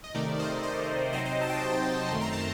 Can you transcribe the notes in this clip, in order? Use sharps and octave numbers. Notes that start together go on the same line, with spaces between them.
D#5
C3 D#3 A3 D#4 A#4 D5
C5 D#5
C5 D#5
C3 F#3 C4 D#4 C5 D#5
C5 D#5
A5
D#5 G5
F#2 D#3 A3 C4 C6
A#5
A5